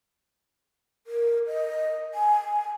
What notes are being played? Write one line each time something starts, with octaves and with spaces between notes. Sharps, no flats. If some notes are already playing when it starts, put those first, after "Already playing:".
A#4
D#5
G#5